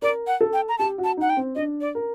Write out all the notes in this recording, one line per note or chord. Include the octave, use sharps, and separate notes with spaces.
A#4 D5
F#5
A4
G5
A#5
G4 A5
F#4
A5
D#4 F#5
G5
C4
D4 D#5
D5
A#4